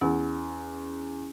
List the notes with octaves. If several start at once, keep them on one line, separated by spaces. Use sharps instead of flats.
E2 C#4